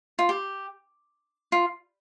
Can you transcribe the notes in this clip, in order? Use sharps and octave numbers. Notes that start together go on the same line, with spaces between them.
F4
G4
F4